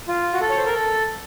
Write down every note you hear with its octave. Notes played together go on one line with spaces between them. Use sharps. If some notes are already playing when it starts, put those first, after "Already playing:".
F4
F#4
A4
C#5
C5
A#4
A4